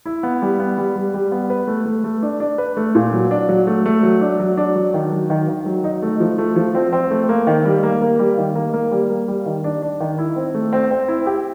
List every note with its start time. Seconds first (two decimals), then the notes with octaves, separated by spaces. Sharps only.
0.06 E4
0.23 B3
0.42 G3
0.59 B3
0.78 G3
0.96 G3
1.14 G3
1.32 B3
1.50 B4
1.68 A3
1.86 A3
2.04 A3
2.22 D4
2.40 D4
2.58 B4
2.77 A3
2.95 A#2
3.13 F#3
3.31 D4
3.49 F#3
3.67 A3
3.86 A3
4.03 F#3
4.21 D4
4.40 F#3
4.57 D4
4.76 F#3
4.94 D#3
5.12 F#3
5.30 D#3
5.48 D#3
5.66 F#3
5.84 D#4
6.02 A3
6.20 F3
6.38 A3
6.56 F3
6.75 C4
6.93 C4
7.11 A3
7.29 A#3
7.47 D#3
7.65 G3
7.83 A#3
8.02 A#3
8.19 G3
8.38 D#3
8.55 A#3
8.74 A#3
8.91 G3
9.09 A#3
9.28 G3
9.46 D#3
9.64 D4
9.82 D4
10.00 D#3
10.18 E4
10.36 C4
10.54 A3
10.73 C4
10.91 C4
11.08 E4
11.26 G4